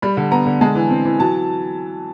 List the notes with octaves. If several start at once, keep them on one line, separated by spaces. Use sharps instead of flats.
G3 B5
D3
B3 A#5
D3
G#3 A5
E3
C4
E3
F#3 A5